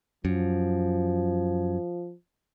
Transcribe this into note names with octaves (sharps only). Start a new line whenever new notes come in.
F#2 F3